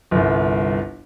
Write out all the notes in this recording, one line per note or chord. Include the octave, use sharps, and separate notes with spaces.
G1 C2